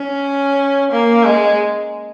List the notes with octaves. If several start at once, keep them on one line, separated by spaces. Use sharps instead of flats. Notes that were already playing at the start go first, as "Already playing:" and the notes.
Already playing: C#4
A#3
G#3